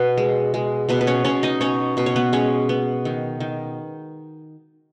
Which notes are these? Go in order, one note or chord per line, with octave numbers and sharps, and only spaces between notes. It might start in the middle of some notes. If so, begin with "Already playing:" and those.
Already playing: B2 B3 B4
G#3
G#3
B2 B3 B4
B4
C#4 C#5
B2 C#4 C#5
D#4 D#5
B2 C#4 C#5
B2 B4
C#5
B3 B4
G#3 C#4 C#5
B3
D#3
D#3